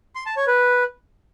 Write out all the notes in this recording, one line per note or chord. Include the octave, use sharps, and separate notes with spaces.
C6
A5
C#5
B4